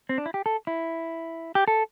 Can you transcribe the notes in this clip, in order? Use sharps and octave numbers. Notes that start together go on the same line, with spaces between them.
C4
D4
E4
G4
A4
E4
G4
A4